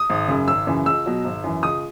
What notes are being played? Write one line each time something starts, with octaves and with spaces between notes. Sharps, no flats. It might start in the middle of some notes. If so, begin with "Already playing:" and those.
Already playing: D#6
G#1
F#2 C#3
G#1 E6
F#2 C#3 E3
C#2 E6
B2 F#3
G#1
F#2 E3
C#2 D#6